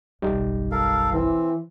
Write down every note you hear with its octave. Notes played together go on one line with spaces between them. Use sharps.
F#1 B1 G3 D#4
A4 A#4 F5
E3 C4